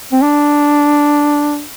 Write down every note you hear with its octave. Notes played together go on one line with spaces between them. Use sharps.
C4
D4